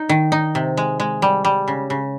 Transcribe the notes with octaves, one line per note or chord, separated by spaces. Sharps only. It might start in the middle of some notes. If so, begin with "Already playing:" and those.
Already playing: D#4
D#3
D#4
C3
G#3
G#3
G3
G3
C#3
C#3